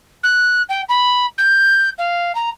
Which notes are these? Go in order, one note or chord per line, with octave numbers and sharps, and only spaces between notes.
F#6
G5
B5
G6
F5
A#5